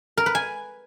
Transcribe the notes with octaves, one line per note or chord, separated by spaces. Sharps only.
A#4
B4
G#5